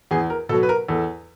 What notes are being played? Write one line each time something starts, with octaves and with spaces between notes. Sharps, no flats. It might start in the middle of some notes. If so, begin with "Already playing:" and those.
E2 G#4
A#4
B2 F#3 A4
B4
A#4
E2 A4